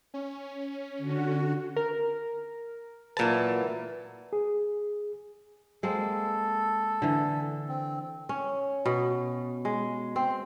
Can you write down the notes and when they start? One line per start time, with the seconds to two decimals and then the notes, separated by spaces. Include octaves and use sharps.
0.14 C#4
0.98 D3 F#4
1.76 A#4
3.17 A#2 E3 F#3 B4 A5
4.33 G#4
5.83 G#3 A#3 C4 A4
7.02 D3 E3
7.68 C4
8.29 C#4
8.85 B2
9.65 G#3
10.16 C4